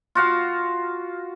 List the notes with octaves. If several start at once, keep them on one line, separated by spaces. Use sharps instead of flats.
F4 F#4 F5